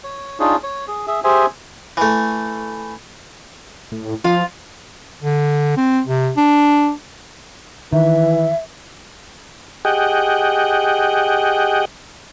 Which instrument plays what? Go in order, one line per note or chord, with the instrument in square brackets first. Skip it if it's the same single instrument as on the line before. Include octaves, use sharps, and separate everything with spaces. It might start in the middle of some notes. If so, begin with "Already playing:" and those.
[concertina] C#5
D4 D#4 F4 G#4 C#5
C#5
G#4
G#4 E5
G4 G#4 C5 E5 G#5
[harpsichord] E3 A3
[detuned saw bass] A2
[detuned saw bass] F3 [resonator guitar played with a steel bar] F4 F5
[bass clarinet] D3
C4
C3
D4
[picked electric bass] D#3 [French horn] E3 [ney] E5
[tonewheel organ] G4 G#4 D#5 F#5 G5